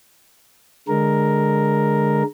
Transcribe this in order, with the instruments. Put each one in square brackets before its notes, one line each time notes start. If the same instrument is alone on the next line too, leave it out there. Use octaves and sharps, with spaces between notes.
[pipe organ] D3 G#3 A#4